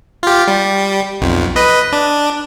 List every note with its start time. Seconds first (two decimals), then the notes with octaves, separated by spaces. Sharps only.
0.23 F4 G4
0.48 G3
1.21 B1 F2
1.56 B4 D#5
1.92 D4